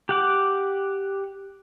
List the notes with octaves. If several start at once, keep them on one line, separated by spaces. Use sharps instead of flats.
G4 F#5 D6